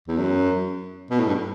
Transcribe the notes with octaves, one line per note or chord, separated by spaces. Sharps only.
E2
F#2
B2
A2
G2